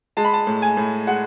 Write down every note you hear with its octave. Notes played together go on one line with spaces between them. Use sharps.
G#3 A5
B5
A5
A2
G#5
A2
G#3 F#5